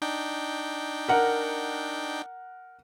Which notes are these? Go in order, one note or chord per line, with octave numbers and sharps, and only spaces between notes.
D4 D#4 G5
A#4 F#5